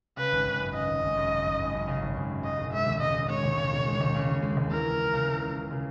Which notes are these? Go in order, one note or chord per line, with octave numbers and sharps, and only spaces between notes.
C#3 B4
G#1
G#1
F#2
C#3 D#5
G#1
G#1
F#2
C#3
G#1
G#1
F#2
C#3
G#1
G#1
F#2
C#3 D#5
E1
G#3 E5
D#2
C#3 D#5
E1
G#3 C#5
D#2
C#3
E1
G#3
D#2
C#3
E1
G#3
D#2
E3 A#4
C#2
C#2
C#3
E3
C#2
C#2
C#3